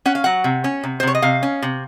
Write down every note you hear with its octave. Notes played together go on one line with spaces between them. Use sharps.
C#4 F#5
F5
F#3 F#5
C3
C#4
C3
C5
C3 C#5
D#5
C3 F5
C#4
C3